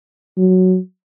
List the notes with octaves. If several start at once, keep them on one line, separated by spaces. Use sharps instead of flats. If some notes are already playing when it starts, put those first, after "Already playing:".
F#3